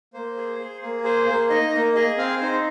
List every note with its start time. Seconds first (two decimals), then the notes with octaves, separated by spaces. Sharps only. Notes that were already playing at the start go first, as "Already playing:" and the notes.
0.13 A#3 C5
0.37 G#4
0.59 G#4
0.82 A#3
1.04 G#4 C5
1.27 A#3
1.50 D#4 D#5
1.73 A#3
1.95 G#4 D#5
2.18 C4 F5
2.41 D#4 C5